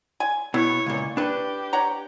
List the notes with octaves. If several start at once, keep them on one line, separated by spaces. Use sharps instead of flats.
G#5
B2 E4 C#5
C#2 A#2
D4 G4 B4
C#5 F#5 A#5